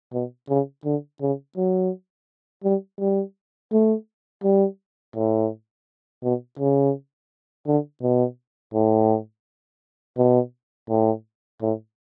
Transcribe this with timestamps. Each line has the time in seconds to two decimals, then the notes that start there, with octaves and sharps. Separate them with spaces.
0.13 B2
0.49 C#3
0.85 D3
1.21 C#3
1.57 F#3
2.64 G3
3.00 G3
3.72 A3
4.44 G3
5.16 A2
6.23 B2
6.59 C#3
7.67 D3
8.02 B2
8.74 A2
10.18 B2
10.90 A2
11.62 A2